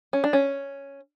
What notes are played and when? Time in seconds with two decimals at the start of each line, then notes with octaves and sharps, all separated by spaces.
0.13 C#4
0.24 D4
0.33 C#4